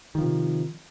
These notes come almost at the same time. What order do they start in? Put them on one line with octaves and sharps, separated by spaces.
D#3 F3 C3